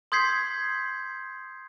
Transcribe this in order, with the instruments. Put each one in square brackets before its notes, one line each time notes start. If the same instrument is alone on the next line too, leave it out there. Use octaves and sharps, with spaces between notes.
[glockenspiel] C6 D#6 G6 G#6 B6 C7